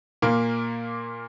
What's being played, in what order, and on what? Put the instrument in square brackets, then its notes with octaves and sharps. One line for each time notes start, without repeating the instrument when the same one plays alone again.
[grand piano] A#2 A#3